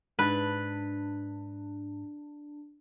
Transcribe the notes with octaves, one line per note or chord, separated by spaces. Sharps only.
G#2 D4 B4 F#6 A6